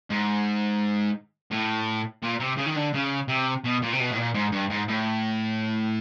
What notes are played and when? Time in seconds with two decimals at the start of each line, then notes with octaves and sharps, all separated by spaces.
0.10 G#2
1.51 A2
2.23 A#2
2.40 C3
2.57 C#3
2.66 D#3
2.76 D3
2.94 C#3
3.28 C3
3.64 B2
3.82 A#2
3.93 C3
4.00 B2
4.11 A2
4.17 A#2
4.34 G#2
4.52 G2
4.70 G#2
4.88 A2